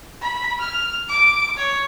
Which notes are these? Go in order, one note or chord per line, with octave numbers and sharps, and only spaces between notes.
B5
F6
D6
C#5